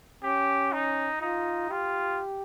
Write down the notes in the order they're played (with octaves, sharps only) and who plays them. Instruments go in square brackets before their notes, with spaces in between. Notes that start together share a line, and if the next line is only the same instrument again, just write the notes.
[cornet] C#4 [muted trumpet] G4
[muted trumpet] D#4
[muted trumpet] D#4 [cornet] F4
[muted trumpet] F4 [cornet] G4